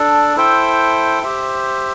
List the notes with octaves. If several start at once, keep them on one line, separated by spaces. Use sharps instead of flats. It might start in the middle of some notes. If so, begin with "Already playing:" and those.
Already playing: D4 A4 D5
E4 A4 C5 E5 G5
G4 C5 E5